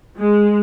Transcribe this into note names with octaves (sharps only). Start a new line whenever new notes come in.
G#3